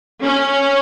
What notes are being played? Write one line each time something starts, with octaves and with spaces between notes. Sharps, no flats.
C#4